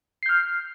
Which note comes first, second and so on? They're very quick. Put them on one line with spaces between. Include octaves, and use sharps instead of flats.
C7 G6 F6